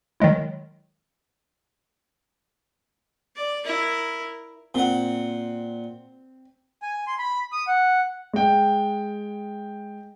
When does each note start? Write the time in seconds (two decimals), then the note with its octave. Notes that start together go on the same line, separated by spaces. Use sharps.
0.20 D#3 F#3 G#3 E4
3.36 D5
3.64 E4 A#4
4.74 A#2 C4 F#5
6.82 G#5
7.07 C6
7.19 B5
7.52 D#6
7.67 F#5
8.33 G#3 G5